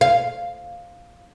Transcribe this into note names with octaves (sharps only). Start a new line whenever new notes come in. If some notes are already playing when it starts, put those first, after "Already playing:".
F5